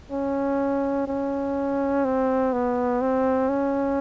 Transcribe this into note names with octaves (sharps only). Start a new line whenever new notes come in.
C#4
C#4
C4
B3
C4
C#4